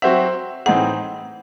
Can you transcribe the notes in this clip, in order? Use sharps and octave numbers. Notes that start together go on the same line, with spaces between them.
F#3 C4 F#4 C5 E5 F#5
A2 E3 C4 D#4 G#4 F#5